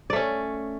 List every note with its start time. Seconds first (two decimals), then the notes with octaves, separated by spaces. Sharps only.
0.10 D5
0.13 A3
0.16 C#4